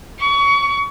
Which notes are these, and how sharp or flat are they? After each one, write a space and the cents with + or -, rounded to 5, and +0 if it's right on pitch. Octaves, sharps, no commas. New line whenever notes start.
C#6 +30